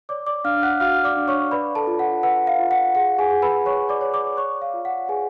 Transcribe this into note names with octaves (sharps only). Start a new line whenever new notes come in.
C#5 D5 D6
D5 D6
D4 F5 F6
F#5 F#6
F#4 F5 F6
D5 D6
D4
C#5 C#6
B4 D5 B5
A4 A5
F4
F#5
B4 F#5
F5
F4
F#5
G#4 F#5
G#4 G#5
G#4
B4 B5
C#5 C#6
D5 D6
C#5
D5 D6
C#5 D5 C#6
F5
F4
F#5
G#4 B4 G#5